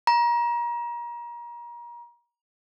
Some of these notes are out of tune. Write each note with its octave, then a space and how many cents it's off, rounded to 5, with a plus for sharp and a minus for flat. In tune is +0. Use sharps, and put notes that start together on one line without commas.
A#5 +30